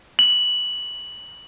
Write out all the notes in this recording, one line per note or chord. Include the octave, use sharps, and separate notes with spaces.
F#7